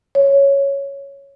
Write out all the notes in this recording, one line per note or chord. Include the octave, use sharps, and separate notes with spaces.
C#5